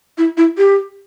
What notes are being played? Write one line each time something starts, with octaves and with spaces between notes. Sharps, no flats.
E4
E4
G4